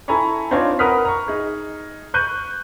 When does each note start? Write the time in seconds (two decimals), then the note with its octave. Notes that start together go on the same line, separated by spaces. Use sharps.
0.08 E4 A4 G#5 A#5 B5 C#6
0.51 C4 D4 D#4 F4 C#5
0.79 A#4 B4 F#5 D#6 F6 B6
1.05 A#5 C#6
1.28 D#4 G#4
2.14 C#6 F#6 G6 D#7